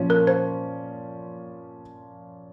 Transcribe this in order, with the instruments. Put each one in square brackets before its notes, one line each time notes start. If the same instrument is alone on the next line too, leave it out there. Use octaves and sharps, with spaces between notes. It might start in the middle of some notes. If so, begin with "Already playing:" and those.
Already playing: [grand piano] A#2 F3 C#4
[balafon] A#4
C5